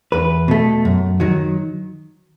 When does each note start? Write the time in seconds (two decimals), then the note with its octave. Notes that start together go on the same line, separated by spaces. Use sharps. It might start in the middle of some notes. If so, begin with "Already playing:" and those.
0.12 E2 B4
0.48 B2 A3
0.85 F#2
1.20 D#3 F#3